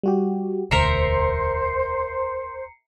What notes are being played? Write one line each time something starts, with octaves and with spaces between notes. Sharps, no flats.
G3 F#4 G4
E1 D2 A#4 C5 E5 A#5 C7 C#7